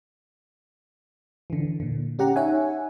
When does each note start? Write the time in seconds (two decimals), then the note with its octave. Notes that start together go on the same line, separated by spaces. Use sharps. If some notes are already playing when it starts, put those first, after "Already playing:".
1.50 D3 E3
1.80 A#2 D3
2.19 C#4 G4 F#5 A#5
2.36 D#4 C#5 E5 F#5 G#5